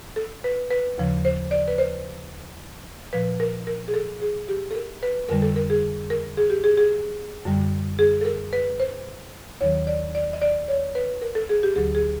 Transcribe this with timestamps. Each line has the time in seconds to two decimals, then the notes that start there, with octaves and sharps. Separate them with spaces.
0.16 A4
0.44 B4
0.71 B4
0.98 D#2 C#3 F3
1.25 C5
1.51 D5
1.68 B4
1.78 C5
3.13 A#2 F3 B4
3.40 A#4
3.67 A#4
3.88 G#4
3.94 A4
4.22 G#4
4.48 G4
4.71 A4
4.75 A#4
5.03 B4
5.29 F2 D3 G3 A#4
5.42 A4
5.56 A#4
5.70 G#4
6.10 A#4
6.37 G#4
6.50 G4
6.64 G#4
6.78 G#4
7.45 F#2 D3 G3
7.99 G#4
8.21 A4
8.25 A#4
8.53 B4
8.80 C5
9.61 D#2 D#3 F#3 C#5
9.87 D5
10.15 D5
10.33 D#5
10.42 D5
10.68 C#5
10.95 B4
11.22 A#4
11.35 A4
11.49 G#4
11.63 G4
11.76 D2 D3 F#3 G#4
11.95 G#4